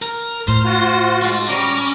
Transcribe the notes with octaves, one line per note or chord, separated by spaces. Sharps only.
A#4
A2 C5 F6
F4 F#4
G#3 C5
G3 C#4 A#5 D6